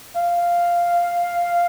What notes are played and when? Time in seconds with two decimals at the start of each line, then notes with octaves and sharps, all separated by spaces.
0.17 F5